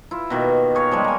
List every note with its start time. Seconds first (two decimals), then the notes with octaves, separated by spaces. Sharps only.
0.11 E4 F4
0.30 B2 D#3 A#3
0.75 G#4 C#5 F5
0.91 F3 G3 G#3
1.04 A#3 G#5